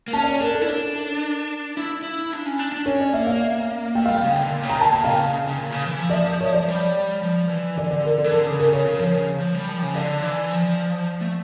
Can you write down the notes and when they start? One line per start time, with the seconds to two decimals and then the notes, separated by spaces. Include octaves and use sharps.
0.08 A#3
0.13 C#4 A5
0.23 D5
0.27 C#5
0.40 D4 A#4
0.54 A4
0.62 E4
0.68 D4 A#4
1.77 E4
2.03 E4
2.32 D4
2.46 C#4
2.59 D4
2.72 D4
2.86 C#4 C#5
3.00 D5
3.13 A#3 E5
3.27 F5
3.95 A3 G5
4.06 G3 F5
4.16 G5
4.23 C#3
4.36 D3
4.49 A#2
4.63 C#3
4.70 A#5
4.77 A#2 A5
4.91 A#2 G5
5.04 C#3 F5
5.47 C#3
5.58 A#2
5.72 C#3
5.86 E3
5.99 F3
6.10 D5
6.13 E5
6.27 D5
6.41 C#5
6.54 D5
6.62 F3
6.69 G3
7.23 F3
7.49 E3
7.76 D3 D5
7.91 D5
8.05 A#4
8.18 A4
8.24 E3
8.31 D3 A#4
8.45 C#3
8.59 C#3 A#4
8.72 C#3 C#5
8.85 C#3 A#4
8.98 F3 C#5
9.14 C#3
9.40 F3
9.55 G3
9.69 F3
9.82 C#3
9.95 D3 D5
10.22 E3
10.50 F3
11.21 A3